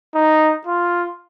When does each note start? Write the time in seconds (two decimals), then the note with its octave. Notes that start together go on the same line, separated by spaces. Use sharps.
0.15 D#4
0.67 F4